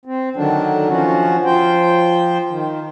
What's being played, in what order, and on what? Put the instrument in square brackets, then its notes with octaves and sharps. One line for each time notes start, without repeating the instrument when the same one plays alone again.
[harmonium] C4
D3 D#3 F#3 D4
F3 C#4 F#4
F3 C5 G5
D#3